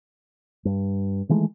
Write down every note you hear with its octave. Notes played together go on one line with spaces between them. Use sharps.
G2
D#3 E3 G#3 A3